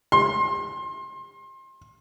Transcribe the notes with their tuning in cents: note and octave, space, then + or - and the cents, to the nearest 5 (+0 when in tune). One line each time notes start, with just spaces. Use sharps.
C6 +30